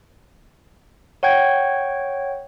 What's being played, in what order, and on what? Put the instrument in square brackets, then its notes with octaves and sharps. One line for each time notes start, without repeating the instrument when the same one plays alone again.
[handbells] C#5 F#5 G5 G#6